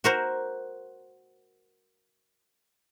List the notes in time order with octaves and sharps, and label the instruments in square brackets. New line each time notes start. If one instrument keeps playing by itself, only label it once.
[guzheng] F#4 A#4 C5